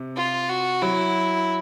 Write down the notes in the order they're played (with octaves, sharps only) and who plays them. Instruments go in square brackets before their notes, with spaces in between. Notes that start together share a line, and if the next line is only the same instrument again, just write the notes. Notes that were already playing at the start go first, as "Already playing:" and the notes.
Already playing: [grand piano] C3
[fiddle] F4
F#4
[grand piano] F#3 [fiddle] E4